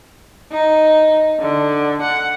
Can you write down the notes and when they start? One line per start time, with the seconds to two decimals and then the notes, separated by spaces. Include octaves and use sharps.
0.52 D#4
1.40 D3
2.02 F#5